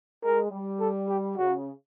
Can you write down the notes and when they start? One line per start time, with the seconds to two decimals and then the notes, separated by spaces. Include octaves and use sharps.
0.23 G#3 A#4
0.51 G3
0.80 A4
1.09 G4
1.38 C#3 F#4